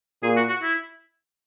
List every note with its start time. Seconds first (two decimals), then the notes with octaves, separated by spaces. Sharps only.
0.23 A#2 G#4
0.36 F#4
0.49 F#4
0.62 E4